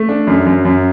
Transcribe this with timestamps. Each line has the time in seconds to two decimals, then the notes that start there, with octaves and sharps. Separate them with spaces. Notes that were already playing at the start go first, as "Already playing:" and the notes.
Already playing: A3
0.09 D4
0.27 F#2
0.47 F#2
0.65 F#2